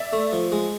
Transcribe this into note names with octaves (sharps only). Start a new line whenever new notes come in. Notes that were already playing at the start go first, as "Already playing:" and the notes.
Already playing: D5 E5
A3
F3
G#3